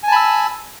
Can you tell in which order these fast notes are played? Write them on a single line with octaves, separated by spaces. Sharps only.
G#5 A5 B5 E6